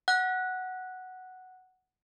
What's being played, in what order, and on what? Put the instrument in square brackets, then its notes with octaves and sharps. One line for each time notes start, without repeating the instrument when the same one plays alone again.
[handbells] F#5 F#6